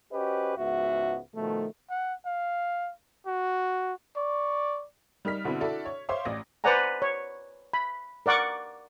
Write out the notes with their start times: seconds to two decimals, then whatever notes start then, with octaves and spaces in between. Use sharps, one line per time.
0.12 C#4 F#4 G4 B4 C5 D#5
0.56 C#2 G#2 B3 F#4 E5
1.35 B2 D#3 F3 A3
1.90 F#5
2.26 F5
3.26 F#4
4.17 D5 C#6
5.25 G3 D#4 A#4 F6 B6
5.44 B2 D3 C4 E4
5.60 D4 E4 F#4 A4 D5 E5
5.85 C#5
6.09 C5 C#5 E5 F5 C6 D6
6.25 A1 D5 A#6
6.64 B4 C5 D5 F#5 G#5 A#5
7.02 C#5
7.73 B5
8.26 A#4 D5 F#5 C#6 D6